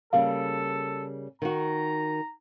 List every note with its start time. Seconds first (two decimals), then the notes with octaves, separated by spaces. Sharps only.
0.13 C#3 G3 A#3 A4 F5
1.42 D#3 F#4 A#5